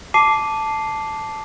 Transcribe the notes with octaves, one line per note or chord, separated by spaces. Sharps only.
A5 D6 C7 D#7